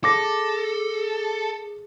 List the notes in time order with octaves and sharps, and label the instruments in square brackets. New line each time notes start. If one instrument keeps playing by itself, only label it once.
[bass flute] G#4 [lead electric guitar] A4 [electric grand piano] D6 A#6